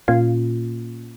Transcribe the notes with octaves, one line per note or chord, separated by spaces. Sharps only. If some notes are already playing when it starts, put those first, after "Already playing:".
A#2 A#3 C#4 F4